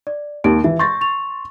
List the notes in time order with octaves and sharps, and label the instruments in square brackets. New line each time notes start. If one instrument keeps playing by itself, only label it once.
[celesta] D5
[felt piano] D#2 [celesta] D#4 G4 D7
[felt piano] E3 [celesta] E5
[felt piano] C6 A6 [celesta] C#6 G6 A#6
[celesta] C#6 F7